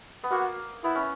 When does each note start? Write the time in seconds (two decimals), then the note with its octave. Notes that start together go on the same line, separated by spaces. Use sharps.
0.24 B3
0.31 A#3 F#4
0.84 B3 E4
0.95 C#4